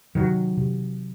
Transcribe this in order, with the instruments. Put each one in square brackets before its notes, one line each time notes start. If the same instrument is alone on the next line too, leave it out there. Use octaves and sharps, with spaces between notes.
[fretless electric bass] C3 D#3 F#3
C3